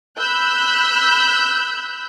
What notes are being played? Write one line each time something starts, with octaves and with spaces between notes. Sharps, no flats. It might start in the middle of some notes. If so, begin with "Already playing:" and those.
B5 E6 F#6 G6